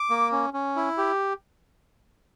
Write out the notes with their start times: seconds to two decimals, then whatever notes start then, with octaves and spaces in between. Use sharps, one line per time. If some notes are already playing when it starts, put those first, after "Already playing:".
Already playing: D6
0.10 A#3
0.32 C#4
0.54 C#4
0.76 E4
0.98 G4